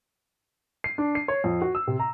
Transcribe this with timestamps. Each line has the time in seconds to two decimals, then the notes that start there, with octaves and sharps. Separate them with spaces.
0.84 C7
0.98 D4
1.15 C7
1.28 C#5
1.44 F2
1.62 F#4
1.75 E6
1.87 C3
2.00 A#5